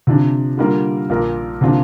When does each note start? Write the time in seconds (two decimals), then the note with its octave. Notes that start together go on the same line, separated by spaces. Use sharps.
0.07 C3 F3 D4
0.57 D3 G3 A#3 F4 A#4
1.10 A#1 A#2 A#3 F4 A#4
1.61 C3 F3 A#3 D4 F4